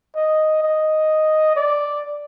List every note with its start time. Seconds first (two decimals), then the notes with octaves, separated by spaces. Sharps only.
0.16 D#5
0.63 D#5
1.56 D5